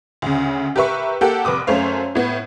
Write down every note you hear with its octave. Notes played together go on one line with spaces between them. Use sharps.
D2 C#3
G4 A#4 B4 E5 C#6
A#3 G4 A4 F#5 G5
F1 B4 D6 D#6
F#2 A3 C5 C#5 F5
A2 B3